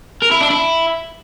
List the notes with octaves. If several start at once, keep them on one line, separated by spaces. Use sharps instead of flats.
A#4
E4
D4
E4